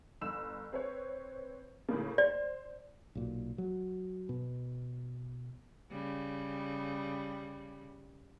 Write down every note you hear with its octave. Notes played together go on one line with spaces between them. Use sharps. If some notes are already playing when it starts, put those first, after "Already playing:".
G1 E6 E7
C4 B4 C#5
A2 C#3 A#3
C5 D5
B1 A#2
F#3
B2
C#3 G3